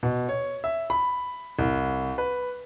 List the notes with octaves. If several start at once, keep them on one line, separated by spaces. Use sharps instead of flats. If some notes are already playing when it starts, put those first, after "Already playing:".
B2
C#5
E5
B5
C2
B4